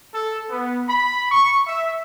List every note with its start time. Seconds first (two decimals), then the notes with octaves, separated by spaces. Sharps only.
0.15 A4
0.50 B3
0.89 B5
1.31 C#6
1.67 E5